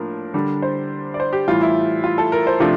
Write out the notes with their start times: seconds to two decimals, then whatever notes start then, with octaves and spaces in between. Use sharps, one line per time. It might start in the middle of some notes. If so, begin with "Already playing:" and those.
Already playing: A2 F3 A#3 D4 A#4
0.34 D3 G3 D4
0.62 C5
1.14 D5
1.20 C5
1.33 G4
1.47 A2 E3 G3 F4
1.61 E4
2.04 F4
2.18 A4
2.32 A#4
2.47 C5
2.60 C3 F3 A3 D4 F4